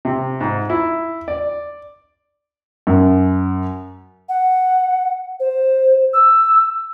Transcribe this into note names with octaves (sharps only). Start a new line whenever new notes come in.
C3
G#2
E4
D5
F#2
F#5
C5
E6